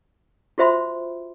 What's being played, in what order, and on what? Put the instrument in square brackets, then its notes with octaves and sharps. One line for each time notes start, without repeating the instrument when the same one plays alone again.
[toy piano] F4 F#4 C5 E5 B5 C6